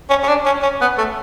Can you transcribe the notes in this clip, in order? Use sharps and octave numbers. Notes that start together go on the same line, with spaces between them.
C#4
C#4
D4
C#4
C#4
B3
A3